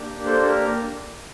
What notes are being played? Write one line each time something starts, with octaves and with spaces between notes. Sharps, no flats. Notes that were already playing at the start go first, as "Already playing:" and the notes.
Already playing: A#3 D4 G4
A4 C5
A4
A#4